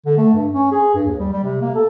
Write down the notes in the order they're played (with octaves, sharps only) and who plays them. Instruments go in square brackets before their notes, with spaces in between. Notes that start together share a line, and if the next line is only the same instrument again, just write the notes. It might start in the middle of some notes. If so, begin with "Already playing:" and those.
[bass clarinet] D3
A3
G2
C#4
G#4
G2
D#2
G3
G3
C3
A#3
A4